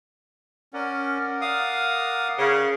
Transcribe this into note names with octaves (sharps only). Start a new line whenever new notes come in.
C#4 A#4 D5 F#5
F5 D#6
C#3